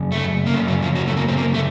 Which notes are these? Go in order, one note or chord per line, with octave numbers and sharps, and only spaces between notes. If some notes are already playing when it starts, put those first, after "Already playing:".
Already playing: F#2 C#3
A3
A#3
F#2 C#3 A3
F#3
F3
F#3
A3
A#3
C4
A#3
A3